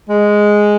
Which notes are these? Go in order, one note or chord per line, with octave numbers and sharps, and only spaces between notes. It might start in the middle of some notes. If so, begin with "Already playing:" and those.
G#3